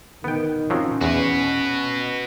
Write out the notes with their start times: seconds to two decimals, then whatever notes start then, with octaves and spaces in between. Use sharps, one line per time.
0.24 D#3 B3 G5
0.70 F3 F#3 C4 C#4
1.01 E2 F#4 B4 F#5